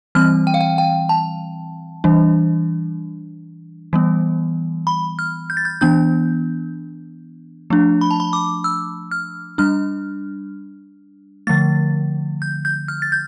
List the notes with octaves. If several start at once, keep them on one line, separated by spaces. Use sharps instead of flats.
E3 G3 C4 F6
G5
F5
G5
G5
A5
E3 G3 D4
E3 G3 B3
B5
F6
G6
A6
G6
E3 B3 D4 G6
F3 A3 D4
B5
A5
B5
D6
E6
F6
G3 D4 F6
D3 F3 A3 A6
G6
G6
F6
A6
G6